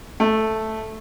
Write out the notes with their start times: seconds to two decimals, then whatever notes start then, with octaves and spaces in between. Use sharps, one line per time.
0.20 A3